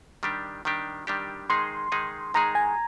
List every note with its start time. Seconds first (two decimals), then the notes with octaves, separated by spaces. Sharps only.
0.23 D#3 G3 D4 G4
0.65 D#3 G3 D4 G4
1.07 D#3 G3 D4 G4
1.50 D#3 G#3 D#4 G#4 C6
1.92 D#3 G#3 D#4 G#4
2.34 D#3 G#3 D#4 G#4 A#5
2.55 G#5